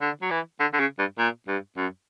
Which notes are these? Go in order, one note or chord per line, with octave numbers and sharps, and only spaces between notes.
D3
F#3
E3
D3
D3
C#3
G2
A#2
G2
F#2